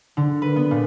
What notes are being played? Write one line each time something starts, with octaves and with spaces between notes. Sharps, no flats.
D3
B4
B3
A#2